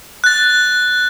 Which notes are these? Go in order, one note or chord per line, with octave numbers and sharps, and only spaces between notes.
F#6 A6